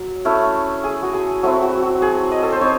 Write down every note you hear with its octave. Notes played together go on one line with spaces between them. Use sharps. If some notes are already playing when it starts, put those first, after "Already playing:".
Already playing: F#3
A3 C#4 E4
G#4
F#4
G#4
F#3 A3 C4 E4 F#4
F#4
F#4
G#4
D#5
A4
C5
C4 D#4 C#5